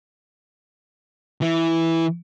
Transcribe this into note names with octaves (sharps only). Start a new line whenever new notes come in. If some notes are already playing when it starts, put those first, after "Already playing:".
E3 E4